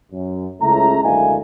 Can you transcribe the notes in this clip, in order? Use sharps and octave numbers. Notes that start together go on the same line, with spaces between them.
F#2
C#2 C#3 A3 E4 A#5
F#1 D2 G#3 A#3 E4 G#5